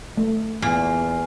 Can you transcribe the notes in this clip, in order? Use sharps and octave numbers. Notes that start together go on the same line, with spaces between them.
A3
E2 A#2 G#5 F6 C7